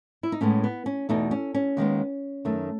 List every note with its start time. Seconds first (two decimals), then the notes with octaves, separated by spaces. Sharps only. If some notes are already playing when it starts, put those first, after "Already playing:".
0.23 E4
0.32 D#4
0.41 A2 G#3 B3 C#4
0.64 B3
0.86 C#4
1.09 E2 B2 A3 D#4
1.31 C#4
1.54 C#4
1.77 D#2 D#3 G#3 B3
2.45 F#2 D#3 A3